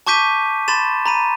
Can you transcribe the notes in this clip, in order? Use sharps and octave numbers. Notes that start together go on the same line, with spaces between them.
A5 C#6 D6 G6 B6 D#7
B5 C6 A6 E7
A#5 B5 D#7